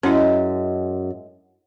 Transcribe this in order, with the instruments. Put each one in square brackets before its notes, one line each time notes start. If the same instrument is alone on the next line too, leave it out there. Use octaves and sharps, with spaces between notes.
[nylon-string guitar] F#2 [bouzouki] G#3 D#5 E5 [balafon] C#4 E4